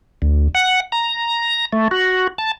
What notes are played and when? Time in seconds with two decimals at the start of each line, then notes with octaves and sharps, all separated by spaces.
0.22 D2
0.55 F#5
0.92 A#5
1.73 A3
1.91 F#4
2.38 A5